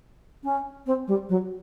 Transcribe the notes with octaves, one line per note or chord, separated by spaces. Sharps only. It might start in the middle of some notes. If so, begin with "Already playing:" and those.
C#4
C4
G3
F#3